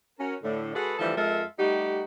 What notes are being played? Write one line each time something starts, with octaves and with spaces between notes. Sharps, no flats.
C#4 F#4 A#4
A2 D3
G#3 F#4 G#4 A4 B4
D3 E3 F3 G3 A3 A4
F2 G#3 F4 A4 A#4 E5
G3 A3 D#4 F#4 G4